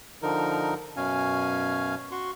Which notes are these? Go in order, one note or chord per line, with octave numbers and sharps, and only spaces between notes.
D3 F3 D#4 A#4
F#2 B2 C#4 F5 G#5
F#4 C6 C#6